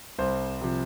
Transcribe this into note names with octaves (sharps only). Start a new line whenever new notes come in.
C2 C5
C3 F3